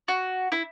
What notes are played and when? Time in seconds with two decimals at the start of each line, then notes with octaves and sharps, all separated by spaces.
0.08 F#4
0.52 E4